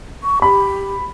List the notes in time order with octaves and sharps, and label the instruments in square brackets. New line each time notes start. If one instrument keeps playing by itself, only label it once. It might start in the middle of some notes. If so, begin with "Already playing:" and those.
[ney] C#6
[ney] G4 [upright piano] B5